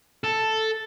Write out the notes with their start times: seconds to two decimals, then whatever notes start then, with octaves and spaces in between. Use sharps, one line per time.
0.24 A4